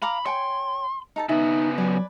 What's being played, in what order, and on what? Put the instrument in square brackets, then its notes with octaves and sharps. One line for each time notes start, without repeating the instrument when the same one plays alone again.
[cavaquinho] F5 A#5 D6 [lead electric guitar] B5
[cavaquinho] C#5 G5 G#5 [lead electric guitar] C6
[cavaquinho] D#4 A4 A5
[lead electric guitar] C#3 B3 [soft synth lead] D#4 [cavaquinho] E5
[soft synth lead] F#3 [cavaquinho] B4 D5 G#5